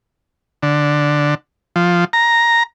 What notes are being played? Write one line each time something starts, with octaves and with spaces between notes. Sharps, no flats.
D3
F3
A#5